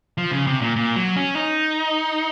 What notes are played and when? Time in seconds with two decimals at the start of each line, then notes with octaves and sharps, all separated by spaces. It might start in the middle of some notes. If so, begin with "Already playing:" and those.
0.18 F3
0.31 C#3
0.47 C3
0.61 A#2
0.76 A#2
0.96 F#3
1.16 C#4
1.36 D#4